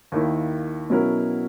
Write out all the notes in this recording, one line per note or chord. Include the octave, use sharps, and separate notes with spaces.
D#2 D#3 A#3 E4
B2 F#3 C#4 E4 A#4